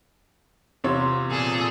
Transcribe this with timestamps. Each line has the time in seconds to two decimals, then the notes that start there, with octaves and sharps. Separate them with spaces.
0.84 E2 C3 F4 C#5
1.28 A#2 G#4 A4